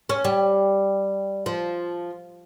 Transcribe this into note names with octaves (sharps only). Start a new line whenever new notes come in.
C#4
G3
F3